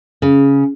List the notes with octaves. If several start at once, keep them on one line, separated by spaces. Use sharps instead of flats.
C#3